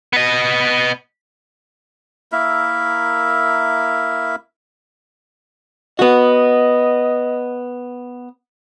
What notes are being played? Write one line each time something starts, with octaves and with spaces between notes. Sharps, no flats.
B3 D#5
A#3 E4 A#4 E5
B3 F#4 D#5